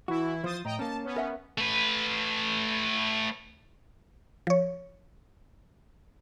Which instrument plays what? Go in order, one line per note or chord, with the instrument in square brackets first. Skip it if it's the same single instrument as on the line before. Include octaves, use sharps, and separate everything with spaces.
[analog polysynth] E3 E4 [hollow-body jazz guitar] F#4
[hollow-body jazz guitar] F3 [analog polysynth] C5 D#6 A6
[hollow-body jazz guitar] A2 [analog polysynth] D#5 G5 A#5
[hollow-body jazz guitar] A#3 C#4 [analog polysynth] A5
[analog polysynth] B3 C#4
[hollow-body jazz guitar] A#4 E5 F#5
[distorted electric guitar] A3 B4
[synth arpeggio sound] F3 C#5